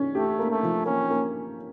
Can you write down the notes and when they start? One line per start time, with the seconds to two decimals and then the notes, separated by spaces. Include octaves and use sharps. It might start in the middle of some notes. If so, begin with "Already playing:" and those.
Already playing: C#4
0.15 A3 G4
0.39 A#3
0.51 A3
0.63 F3
0.86 A#3 C#4
1.10 A#3